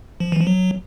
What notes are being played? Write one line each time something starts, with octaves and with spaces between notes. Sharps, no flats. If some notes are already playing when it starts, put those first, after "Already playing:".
F3
E3
F3
F#3